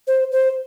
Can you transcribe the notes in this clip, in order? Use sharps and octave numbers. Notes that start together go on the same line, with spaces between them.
C5
C5